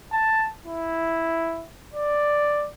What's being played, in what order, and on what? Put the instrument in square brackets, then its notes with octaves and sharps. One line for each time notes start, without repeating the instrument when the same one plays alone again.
[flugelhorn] A5
E4
D5